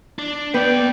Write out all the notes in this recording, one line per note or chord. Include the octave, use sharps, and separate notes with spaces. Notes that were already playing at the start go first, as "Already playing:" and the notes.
D4
B3 B4 D5 G5